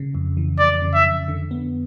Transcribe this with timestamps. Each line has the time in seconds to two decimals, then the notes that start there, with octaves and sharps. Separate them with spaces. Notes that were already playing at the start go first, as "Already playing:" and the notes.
Already playing: C#3
0.14 F2
0.37 E3
0.59 F2 D5
0.82 C#3
0.94 E5
1.05 F2
1.28 D3
1.51 B3